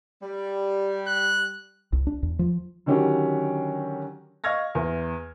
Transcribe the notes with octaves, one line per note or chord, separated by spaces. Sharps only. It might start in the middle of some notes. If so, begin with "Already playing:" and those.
G3
F#6
C2
D4
E2
F3
D3 D#3 F#3 C#4 F#4 G4
D#5 F5 C#6 F6 G#6 A#6
E2